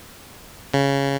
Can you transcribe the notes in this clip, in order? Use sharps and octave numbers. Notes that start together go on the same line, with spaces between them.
C#3